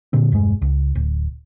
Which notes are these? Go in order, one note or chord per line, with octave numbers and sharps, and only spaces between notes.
A#2 D3 C4
E1 G2 G#3
C#2
D1